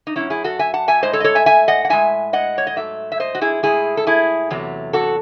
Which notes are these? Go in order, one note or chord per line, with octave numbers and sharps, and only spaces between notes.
D#4
F#2 C#3 F#3 C#4 E4
E4 G#4
F#4 A4
E5 G#5
F#5 A5
E5 G#5
A2 G#3 C5 D#5
A4 C#5
D#5
A4 C#5
E5 G#5
E5 G#5
D#5 F#5
F#5
A2 G#3 E5 G#5
D#5 F#5
C#5
D#5
G#2 F#3 A3 E5
E5
C5 D#5
F#4
E4 G#4
A2 G#3 E4 G#4
A4
E4 G#4
E2 C3 F#3 A3
F#4 A4